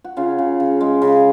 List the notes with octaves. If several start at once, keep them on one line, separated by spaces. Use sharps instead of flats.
F#4
C#3 C#4 F4
C#3
C#3
G#3
C#3